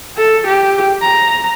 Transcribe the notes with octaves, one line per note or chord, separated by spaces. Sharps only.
A4
G4
A#5